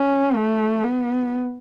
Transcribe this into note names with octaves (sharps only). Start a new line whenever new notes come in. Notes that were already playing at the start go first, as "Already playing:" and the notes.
Already playing: C#4
A3
B3